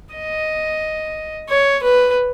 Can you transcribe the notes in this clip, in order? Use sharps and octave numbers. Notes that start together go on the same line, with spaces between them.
D#5
C#5
B4